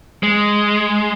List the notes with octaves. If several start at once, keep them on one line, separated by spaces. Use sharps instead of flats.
G#3